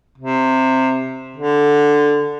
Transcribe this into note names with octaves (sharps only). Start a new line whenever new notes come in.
C3
D3